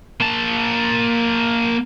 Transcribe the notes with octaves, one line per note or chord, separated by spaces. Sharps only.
A#3 A5